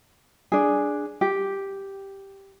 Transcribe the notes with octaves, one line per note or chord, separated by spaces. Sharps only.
D4 G#4
G4